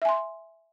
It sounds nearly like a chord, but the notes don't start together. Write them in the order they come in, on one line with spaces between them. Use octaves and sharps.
E5 G#5 C6